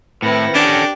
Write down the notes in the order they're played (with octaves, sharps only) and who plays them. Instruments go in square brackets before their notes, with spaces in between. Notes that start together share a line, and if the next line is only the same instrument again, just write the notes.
[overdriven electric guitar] A2 [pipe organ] D#3 F#5 A#6 [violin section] C4 E4 B4
[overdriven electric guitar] C#4 A4 [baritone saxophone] D4 [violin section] G4 G6 D7